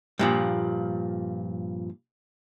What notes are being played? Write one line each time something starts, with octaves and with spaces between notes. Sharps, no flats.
G2 A#2 F3